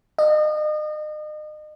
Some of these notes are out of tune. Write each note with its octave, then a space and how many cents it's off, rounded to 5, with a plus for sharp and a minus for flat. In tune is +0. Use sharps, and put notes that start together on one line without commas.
D#5 -35